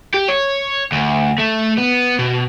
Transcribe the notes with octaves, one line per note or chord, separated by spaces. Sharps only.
G4
C#5
D2
A3
B3
B2